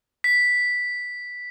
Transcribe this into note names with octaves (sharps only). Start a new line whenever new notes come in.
B6